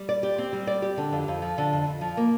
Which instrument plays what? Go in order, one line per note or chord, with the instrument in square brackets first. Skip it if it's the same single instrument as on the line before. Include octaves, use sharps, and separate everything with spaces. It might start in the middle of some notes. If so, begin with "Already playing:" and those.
Already playing: [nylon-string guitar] G3
D5
G4
C4
G3
D5
G4
D3
F2
F2
F3
D3
F2
F2
F3
A#3